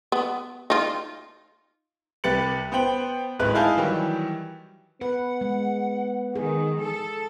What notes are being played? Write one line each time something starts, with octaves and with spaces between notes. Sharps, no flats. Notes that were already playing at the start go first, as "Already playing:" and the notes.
B3
D#4 F4
C2 G4 B4 A6 C#7 F#7
B3 C5 G5 F#7
D1 G#1 G#3 B4 F#6
D#4 E4 F5 G#5 A5 G6
D#3 E3 F#3 G3
B3 B4 F#5
G#3
D#3 G#4
A4